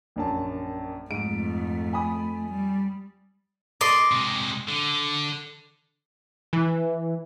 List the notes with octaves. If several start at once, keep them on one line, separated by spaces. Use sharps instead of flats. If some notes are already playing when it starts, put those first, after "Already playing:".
A#1 F#2 A5
F2 G#2 A3 D7
G#5 B5 D#6
G3
D5 D#5 C6
C3 G#3
D3
E3